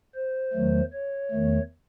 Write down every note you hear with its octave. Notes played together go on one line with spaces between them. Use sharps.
C5
E2 D#3 F#3 A3
C#5
E2 D#3 A3